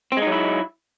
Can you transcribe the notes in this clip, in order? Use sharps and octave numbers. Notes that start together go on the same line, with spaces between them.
F#3 G#3 C4 D#4 E4